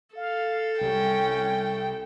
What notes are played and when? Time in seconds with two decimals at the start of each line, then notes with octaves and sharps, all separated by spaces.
0.16 A4 F5
0.81 C2 G3 C#4 G5